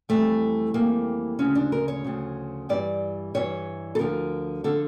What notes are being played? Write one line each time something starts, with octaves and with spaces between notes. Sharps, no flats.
F2 E3 G3 A3
F2 E3 G3 A#3
D2 C#3 F3 C#4
D4
A#4
C#5
D2 C#3 F3
G2 E3 G3 D5
G2 E3 G3 C#5
A4
D2 D3 F3 A#4
D3 F3 A4